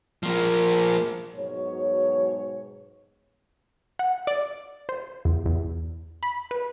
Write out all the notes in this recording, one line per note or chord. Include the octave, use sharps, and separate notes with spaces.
F3 A#3
G#2 B2 F#3 C#5
F#5
D5
C5
E2
E2
B5
B4